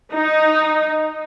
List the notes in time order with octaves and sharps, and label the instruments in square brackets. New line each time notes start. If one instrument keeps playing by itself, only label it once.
[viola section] D#4